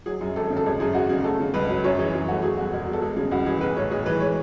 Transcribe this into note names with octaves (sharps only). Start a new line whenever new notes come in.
F#3 G#4
F#2
G#1 A4
C#3
A4
G#1 G#4
F#2 G#4
G#1 F#4
C#3 G#4
A3 A4
C#3
C#2 B4
F#3
F#2 C#5
E3 G#4
F#2 G#4
A3 F#4
F#3 G#4
E2 F#4
E1 G#4
B2
A4
G#3 G#4
C#3 G#4
C#2 F#4
E3 G#4
B1 B4
A2 C#5
B1 G#4
E3 B4
G#3 C#5